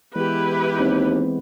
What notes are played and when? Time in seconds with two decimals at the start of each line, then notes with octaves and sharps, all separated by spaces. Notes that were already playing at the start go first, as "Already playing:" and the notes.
0.15 E3 G#3 B3 E4 G4 B4
0.78 D#2 C4